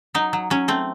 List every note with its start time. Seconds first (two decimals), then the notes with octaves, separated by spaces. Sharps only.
0.14 F#3 D#4
0.33 F#3
0.50 F#3 C#4
0.68 A3 C4